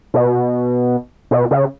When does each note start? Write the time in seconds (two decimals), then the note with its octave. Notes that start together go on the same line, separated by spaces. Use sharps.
0.14 B2
1.31 B2
1.51 C#3